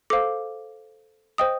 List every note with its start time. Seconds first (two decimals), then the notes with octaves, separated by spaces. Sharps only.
0.10 A4 C5 F5 D6
1.38 C5 D#5 G5 D#6